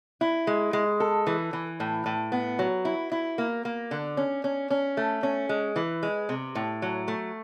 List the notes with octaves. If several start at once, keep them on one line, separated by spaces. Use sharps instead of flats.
E4
G#3
G#3
A4
E3
E3
A2
A2
B3
F#3
E4
E4
A#3
A#3
D3
C#4
C#4
C#4
A3
C#4
G#3
E3
G#3
C3
A2
F#3
A3